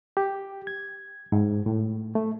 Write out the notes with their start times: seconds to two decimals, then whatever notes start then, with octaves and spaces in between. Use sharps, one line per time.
0.17 G4
0.67 G#6
1.32 G#2
1.66 A2
2.15 A3